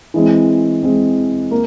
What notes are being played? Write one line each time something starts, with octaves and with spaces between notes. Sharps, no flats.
E3 G#3 C4
E3 G#3 C4
A#3